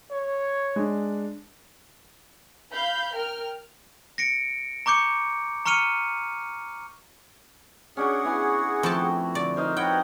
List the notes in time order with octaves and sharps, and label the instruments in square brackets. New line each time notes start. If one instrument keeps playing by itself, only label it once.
[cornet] C#5
[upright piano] G#3 D4
[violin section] F5 B5 G6
A#4 G5 F6
[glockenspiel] A#6 C#7 D7
A#5 C#6 D6 G6 C#7
A#5 C#6 F6 C#7 D#7 F7
[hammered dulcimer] C#4 D4 F#4 [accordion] G#4 F#5
[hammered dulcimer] B3 E4 G#5
[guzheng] F2 G5 A5 [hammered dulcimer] A3 F#4
[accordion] D3 [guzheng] D5
[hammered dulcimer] D#4 A#4 C5
[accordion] F#4 B4 C#5 [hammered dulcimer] F#5 [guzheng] G5